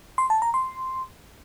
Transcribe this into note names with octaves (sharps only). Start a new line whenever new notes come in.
C6
A5
A#5
C6